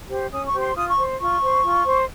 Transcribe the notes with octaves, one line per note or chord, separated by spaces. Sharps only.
G4 C5
C#4 D#6
C#6
G4 C5
C6
F4 D#6
C#6
C5
F4 C#6
C5
F4
C5